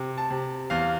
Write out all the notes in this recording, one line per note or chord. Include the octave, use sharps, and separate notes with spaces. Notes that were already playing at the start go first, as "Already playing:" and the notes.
Already playing: C3
A5
C3
E2 F5